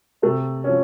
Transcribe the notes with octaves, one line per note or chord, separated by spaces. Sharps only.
C3 A3
C#4
F3